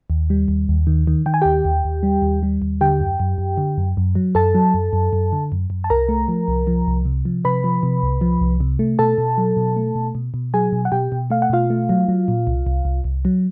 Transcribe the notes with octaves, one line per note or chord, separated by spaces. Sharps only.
D#2
G3
D#2
D#2
D#3
D#3
D#3 G5
G#5
D#2 G4 G5
D#2
D#2
G3
D#2
G3
D#2
D3 G4 G5
F#2
F#2
F#2
D3
F#2
F#2
F#3
F#2 A4 A5
F#3
F#2
F#2
F#2
D3
F#2
F#2
A5
C2 A#4 A#5
A3
F3
C2
F3
C2
C3
F3
C3 B4 B5
F3
C3
C2
F3
C2
C3
A3
B2 A4 A5
B2
F#3
B2
A3
B2
B2
B2
F#3 G#4 G#5
B2
F#5
B2 G4 G5
B2
A3 F5
F#5
B2 F4 F5
A3
F#3
F#3
A#2
C2
C2
C2
C2
F#3